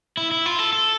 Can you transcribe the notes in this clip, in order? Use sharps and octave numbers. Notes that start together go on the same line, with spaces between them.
E4
E4
F4
A4
A4